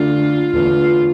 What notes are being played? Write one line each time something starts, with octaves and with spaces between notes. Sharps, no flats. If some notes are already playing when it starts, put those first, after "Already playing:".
Already playing: D3 A3 D4 F4
E2 D3 A3 F4